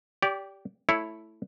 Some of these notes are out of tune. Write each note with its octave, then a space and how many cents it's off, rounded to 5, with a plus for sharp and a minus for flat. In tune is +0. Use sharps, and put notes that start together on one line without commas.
G4 +0 D5 -25
A3 +0 E4 +0 C#5 +0